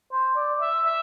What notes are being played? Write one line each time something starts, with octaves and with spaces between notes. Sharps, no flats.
C5
D5
E5
E5